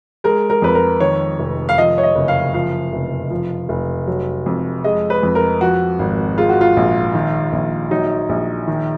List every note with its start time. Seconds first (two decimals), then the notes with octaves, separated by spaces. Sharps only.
0.24 G#3 A#4
0.50 A#4
0.62 F2 B4
0.75 A#4
1.00 D#3 C#5
1.39 F1
1.69 F5
1.78 F3 D#5
1.98 C#5
2.03 D#5
2.15 F#1
2.28 F5
2.54 F3 F5
2.93 F1
3.30 F3
3.69 F1
4.07 F#3
4.46 F2
4.84 G#3 D#5
5.10 B4
5.23 F2
5.35 A#4
5.61 F3 F#4
5.99 G#1
6.38 G#3 F4
6.49 F#4
6.61 F4
6.77 A#1
7.14 D#3
7.53 A#1
7.90 F#3 D#4
8.29 A#1
8.67 D#3